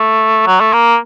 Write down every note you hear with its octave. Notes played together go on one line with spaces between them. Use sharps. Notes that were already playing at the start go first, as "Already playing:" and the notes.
Already playing: A3
F#3
A3
A#3